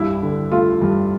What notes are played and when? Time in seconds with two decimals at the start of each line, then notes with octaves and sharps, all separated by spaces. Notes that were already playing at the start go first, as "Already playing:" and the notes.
Already playing: C2 G2 E4
0.22 D3
0.51 A3 F4
0.82 G2